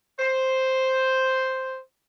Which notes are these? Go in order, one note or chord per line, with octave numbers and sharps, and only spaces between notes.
C5